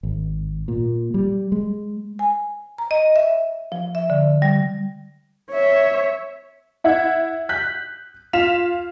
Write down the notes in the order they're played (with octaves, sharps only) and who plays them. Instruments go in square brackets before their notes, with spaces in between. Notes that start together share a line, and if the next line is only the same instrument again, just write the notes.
[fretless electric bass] G#1
A#2
G3
G#3
[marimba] G#5
A#5
D#5
E5
F3
E5
D3
G3
[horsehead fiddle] C#5 E5
[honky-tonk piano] E4 E5 F#5 G#6
F#6 G6 B6
F4 F5 B6 E7 F7